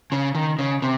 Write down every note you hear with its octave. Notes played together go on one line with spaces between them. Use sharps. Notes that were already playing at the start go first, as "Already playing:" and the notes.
C#3
D#3
C#3
C3